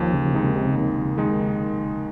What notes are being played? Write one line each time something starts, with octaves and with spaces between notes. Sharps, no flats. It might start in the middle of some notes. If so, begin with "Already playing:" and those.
Already playing: D#2 F3
C#3
C3 D#3 G#3 D#4
C3
D#2
D#3 G#3 D#4